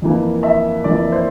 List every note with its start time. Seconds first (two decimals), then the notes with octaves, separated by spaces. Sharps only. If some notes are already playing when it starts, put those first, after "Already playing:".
0.02 F2 E3 A#3
0.43 E5
0.84 F2 E3 A#3 D5
1.12 C5